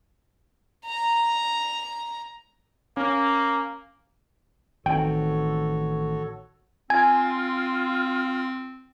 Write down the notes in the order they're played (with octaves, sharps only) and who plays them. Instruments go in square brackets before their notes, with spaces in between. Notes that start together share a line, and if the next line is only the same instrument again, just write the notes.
[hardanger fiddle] A#5
[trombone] A#3 [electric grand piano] C#4
[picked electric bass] A1 C4 [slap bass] D#3 [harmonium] F#4 A4 C#5 [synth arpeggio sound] G5
[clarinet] C4 [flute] F4 [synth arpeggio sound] G#5